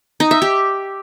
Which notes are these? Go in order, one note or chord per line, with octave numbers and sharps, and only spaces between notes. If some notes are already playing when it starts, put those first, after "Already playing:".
D#4
E5
G4